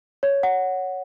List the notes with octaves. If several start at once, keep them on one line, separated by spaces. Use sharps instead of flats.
C#5
F#5